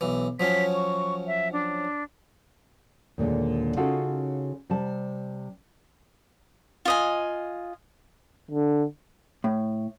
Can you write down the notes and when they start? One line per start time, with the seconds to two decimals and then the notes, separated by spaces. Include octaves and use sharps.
0.01 B1 E3
0.40 F3 F#3 C#4 B6
0.75 C#6
1.27 E5
1.53 D4
3.18 D#2 A#2 D3 G#3
3.77 C#3 C#4 D#4 F4 F#4 A4
4.70 C3 G3 A5
6.85 F4 D#5 G#5
8.51 D3
9.44 A2